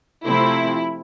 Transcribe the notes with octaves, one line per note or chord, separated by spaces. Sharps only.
C3 F3 A3 C4 E4